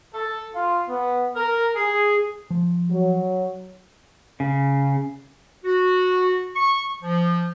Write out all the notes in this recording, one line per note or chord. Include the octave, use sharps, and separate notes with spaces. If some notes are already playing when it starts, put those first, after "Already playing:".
A4
F4
B3
A#4
G#4
F3
F#3
C#3
F#4
C#6
F3